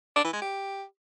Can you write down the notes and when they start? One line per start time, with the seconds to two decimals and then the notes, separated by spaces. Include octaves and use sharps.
0.16 D4
0.24 E3
0.33 G#3
0.42 G4